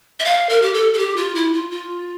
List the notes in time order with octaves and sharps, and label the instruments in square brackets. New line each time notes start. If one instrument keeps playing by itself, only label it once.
[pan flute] E5
F5
A#4
G4
A4
A4
G4
F4
E4
F4
F4